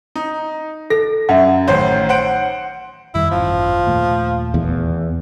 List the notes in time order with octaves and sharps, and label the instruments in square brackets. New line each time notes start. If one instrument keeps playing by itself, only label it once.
[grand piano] D#4
[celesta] A4 [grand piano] A#6
[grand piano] F#2 [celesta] E5 F#5
[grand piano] A1 D#3 C5 [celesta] C#5
[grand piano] C5 F#5 D7
[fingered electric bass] F2 D#3 G3 [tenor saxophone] E4
[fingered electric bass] D1 G#1 F#2 [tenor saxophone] F3
[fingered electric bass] D#2 A#2 A3
[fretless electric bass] E2